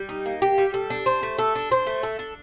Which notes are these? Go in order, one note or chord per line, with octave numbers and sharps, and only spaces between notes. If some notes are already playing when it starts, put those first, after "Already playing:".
Already playing: G3
D#4
A#3
G4
G3
A4
D4
C5
A3
A4
D4
C5
A3
A4
D4